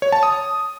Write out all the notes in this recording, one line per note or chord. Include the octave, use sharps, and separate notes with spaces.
C#5
A5
D#6